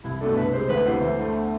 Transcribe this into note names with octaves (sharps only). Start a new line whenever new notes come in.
C2 E4
B2 A3 D4 A4
C2 B4
C3 G#3 C5
D2 B4
C3 E3 B3 E4 C5
D2
D3 A3